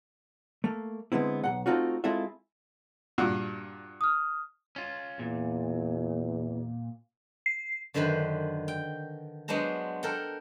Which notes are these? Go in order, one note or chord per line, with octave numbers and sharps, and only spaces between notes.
A3 A#3
D3 G#3 B3 C4 E4
B1 F3 F#5
A3 C4 D#4 F4 F#4
G#3 C4 E4 F4 A4 E5
G2 A#2 F#4
D#6 F6
C#4 F4
E2 A#2
C7
F#2 D3 D#3 B4 C5 B5
G5
F#3 G#3 B3 D4 C5 A#5
A4 A#4 F#5 G5